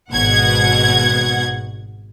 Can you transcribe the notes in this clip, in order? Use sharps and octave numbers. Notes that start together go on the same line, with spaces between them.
G#1 B2 F#5 G#6